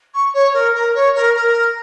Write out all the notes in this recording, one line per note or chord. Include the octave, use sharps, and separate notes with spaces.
C#6
C#5
A#4
A#4
C#5
A#4
A#4